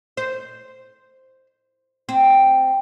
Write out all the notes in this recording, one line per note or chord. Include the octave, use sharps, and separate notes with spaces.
C5
C4